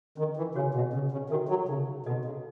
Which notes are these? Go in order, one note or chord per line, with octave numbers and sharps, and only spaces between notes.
D#3 C#4
E3
C#3 F#4 C#5 G#5
B2
C#3 C#4
C#3
D#3 F#4 A4 E5
F#3
C#3 D#4
B2 F#4 A4 D#5
C#3